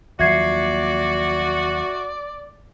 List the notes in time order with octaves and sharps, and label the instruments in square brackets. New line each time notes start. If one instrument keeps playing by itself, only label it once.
[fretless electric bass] D#2 F3 F#3 [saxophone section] F#4 [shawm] D5 [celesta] E5 G#6 C7